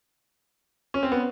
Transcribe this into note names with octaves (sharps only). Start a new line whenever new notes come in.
C#4
C4
B3